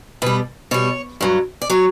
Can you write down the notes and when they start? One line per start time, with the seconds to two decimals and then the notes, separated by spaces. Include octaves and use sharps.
0.22 B2 G3 B4
0.71 B2 G3 C#5
1.21 G2 F#3
1.62 D5
1.70 F#3 C#5